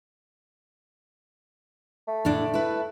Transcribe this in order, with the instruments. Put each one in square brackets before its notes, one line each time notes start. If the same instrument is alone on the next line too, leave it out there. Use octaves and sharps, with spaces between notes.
[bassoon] A3
[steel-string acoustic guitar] A2 D3 D4
E4 B4